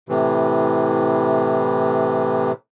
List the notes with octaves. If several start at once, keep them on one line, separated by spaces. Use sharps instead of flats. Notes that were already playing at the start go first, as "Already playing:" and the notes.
A2 C3 E3